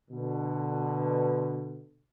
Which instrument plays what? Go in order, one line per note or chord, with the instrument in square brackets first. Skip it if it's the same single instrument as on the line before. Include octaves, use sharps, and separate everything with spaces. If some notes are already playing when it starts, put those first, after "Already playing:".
[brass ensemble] B2 D3